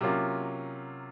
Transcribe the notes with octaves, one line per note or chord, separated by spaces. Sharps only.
C3 F#3 A#3 C#4 F4